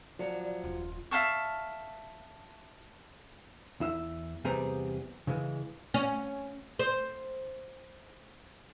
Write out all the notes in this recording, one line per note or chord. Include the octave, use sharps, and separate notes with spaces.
F3 F#3 D5
D#1 F#2 F4
E5 F5 A5 C#6
E2 E4 E5
E2 C3 G3 B3 G#4 A#5
C#3 E3 G#3
C#4
C5